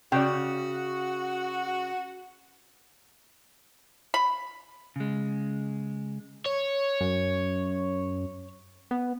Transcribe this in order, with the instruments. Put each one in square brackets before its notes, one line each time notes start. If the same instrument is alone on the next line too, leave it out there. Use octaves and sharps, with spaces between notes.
[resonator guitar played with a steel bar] C#3 [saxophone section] F#4 [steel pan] D5 G5
[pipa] B5
[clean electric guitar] C#3 G#3
[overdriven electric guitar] C#5
[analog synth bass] F#2
B3